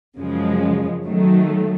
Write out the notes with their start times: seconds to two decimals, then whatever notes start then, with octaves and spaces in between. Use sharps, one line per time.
0.17 F#2 C#3 F3 G#3
1.05 D#3 F#3 A3